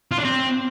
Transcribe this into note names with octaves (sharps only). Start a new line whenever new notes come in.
F4
D4
C4